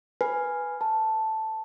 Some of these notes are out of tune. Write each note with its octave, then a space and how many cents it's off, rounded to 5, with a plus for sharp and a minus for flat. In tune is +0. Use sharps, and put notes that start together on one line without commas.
B4 +0 G#5 +0
B4 +0 A5 +0